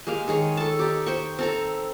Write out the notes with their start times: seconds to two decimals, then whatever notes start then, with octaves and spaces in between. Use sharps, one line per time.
0.07 G#3 A#3 G4 F5
0.28 D#3 G#3 G#4 C#5
0.57 A4 A5
0.79 D#4 G4
1.06 C5 G5 C#6
1.39 C4 A4 A#5